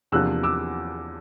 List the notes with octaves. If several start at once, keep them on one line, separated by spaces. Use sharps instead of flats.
E2 C3 F3 A#3 D4 E6 F#6
D6 E6